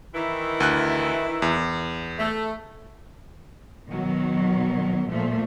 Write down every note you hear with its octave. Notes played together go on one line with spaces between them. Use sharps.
D#3 E3 E4
D2 F#6
E2
A3
B2 D#3 F#3
A#2 F3 A3